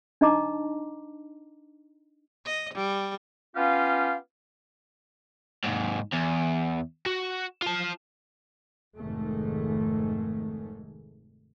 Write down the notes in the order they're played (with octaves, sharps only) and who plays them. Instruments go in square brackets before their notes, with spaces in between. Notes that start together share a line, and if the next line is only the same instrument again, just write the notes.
[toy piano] D4 D#4 D#5 A5 A#5 D6
[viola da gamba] D#5
G3
[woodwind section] B3 C#4 F4 G4 F5
[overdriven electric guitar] D#2 G#2
E2
F#4
F4 A5
[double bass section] F1 G#2 D#3 G#3 A3